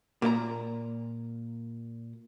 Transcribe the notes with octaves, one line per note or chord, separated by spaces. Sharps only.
A#2 A#3 D5 A#5